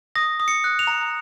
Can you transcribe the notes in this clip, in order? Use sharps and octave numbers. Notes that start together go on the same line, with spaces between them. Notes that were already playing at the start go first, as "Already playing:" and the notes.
D#6 A#6
D#6
C#7
F#6
F7
A#5